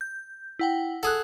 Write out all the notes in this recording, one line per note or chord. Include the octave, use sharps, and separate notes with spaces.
G6
E4 F#5 G5
G#4 A4 F#5 F#6